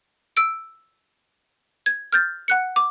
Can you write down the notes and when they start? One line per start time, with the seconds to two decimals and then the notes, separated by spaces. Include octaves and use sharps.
0.37 E6 D7
1.86 G#6
2.13 F6 G6 A6
2.48 F#5 F#6 C#7
2.76 D6